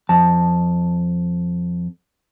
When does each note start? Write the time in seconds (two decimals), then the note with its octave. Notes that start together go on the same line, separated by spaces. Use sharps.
0.09 F2 A5